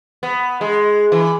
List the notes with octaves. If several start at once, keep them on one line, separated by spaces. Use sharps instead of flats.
B3
G#3
E3